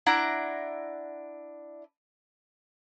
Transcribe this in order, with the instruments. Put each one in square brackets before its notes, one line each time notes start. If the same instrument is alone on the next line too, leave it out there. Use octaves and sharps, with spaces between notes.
[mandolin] D4 E4 F#5 A#5